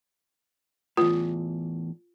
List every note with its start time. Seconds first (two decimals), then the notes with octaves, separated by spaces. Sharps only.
0.97 E2 A2 F4